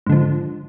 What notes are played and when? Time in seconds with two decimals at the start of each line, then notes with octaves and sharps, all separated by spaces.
0.07 G#2
0.09 D3
0.12 F3